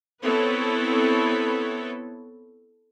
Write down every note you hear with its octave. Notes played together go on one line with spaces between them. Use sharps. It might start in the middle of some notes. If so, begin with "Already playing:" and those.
B3 C4 E4 A4 B4 C#5